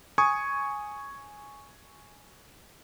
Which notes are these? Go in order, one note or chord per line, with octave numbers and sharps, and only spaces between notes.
G#5 C#6 D#6 G#6